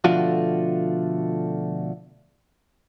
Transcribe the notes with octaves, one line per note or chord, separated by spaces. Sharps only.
B2 D3 F3 A3 F4 F#4